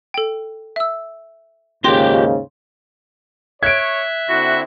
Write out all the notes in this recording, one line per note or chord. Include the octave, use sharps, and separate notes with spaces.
A4 G5
E5 E6
D#2 G#2 C#3 F4 G4 G5 C6 A#6
C#5 E5 F#6 G#6 D7
D3 C4 E4 F#4